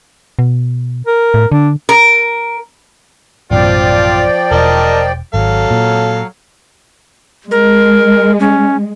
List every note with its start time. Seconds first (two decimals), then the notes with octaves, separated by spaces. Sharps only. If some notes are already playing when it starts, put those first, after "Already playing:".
0.39 B2
1.06 A#4
1.34 A2
1.52 D3 D4
1.89 A#4
3.51 A1 F#2 B2 F3 F4 D5 G5
4.51 E1 A#4 D#5 A5
5.34 G#1 F#3 A4 F5
5.71 A#2
7.51 G#3 A#4
8.40 C#4